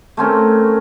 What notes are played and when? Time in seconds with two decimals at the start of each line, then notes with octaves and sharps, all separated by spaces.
0.17 A3 C4 C#4 A#4